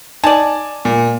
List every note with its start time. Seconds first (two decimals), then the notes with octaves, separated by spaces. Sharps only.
0.24 D#4 D5 G#5 A5
0.85 A#2